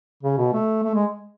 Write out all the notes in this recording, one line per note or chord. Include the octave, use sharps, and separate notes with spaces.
C#3
B2
A3
A3
G#3